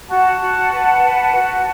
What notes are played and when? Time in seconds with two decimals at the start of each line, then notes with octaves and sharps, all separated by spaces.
0.09 F#4 F#5 A5
0.40 F#4
0.72 B4
1.03 B4
1.35 F#4